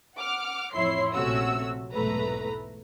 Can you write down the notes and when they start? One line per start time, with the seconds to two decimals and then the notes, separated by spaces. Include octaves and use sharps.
0.16 F#5 D6 F6
0.74 A1 F2 E4 C#5 C6 C7
1.14 A#1 C3 A3 C#4 F#4 E6
1.92 B1 E2 G#2 A3 B4 A#5